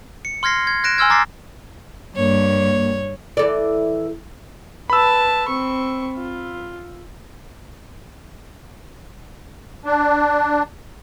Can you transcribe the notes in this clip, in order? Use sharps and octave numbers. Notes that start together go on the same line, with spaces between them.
C#7
C6 F6 G#6 A#6 C7
G#6
F#6 A#6 D7 E7
G#5 C6 E6 F6 G#6
A#5 D6 A6 A#6 C7
G2 A#3 C#5
E3 A4 D5
B4 A5 B5 E6
C4 C#6
F4
D4